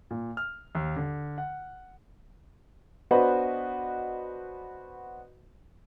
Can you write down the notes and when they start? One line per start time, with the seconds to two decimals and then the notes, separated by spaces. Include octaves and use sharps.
0.11 A#2
0.37 F6
0.75 D#2
0.96 D3
1.38 F#5
3.11 B3 D4 F#4 B4 C5 D#5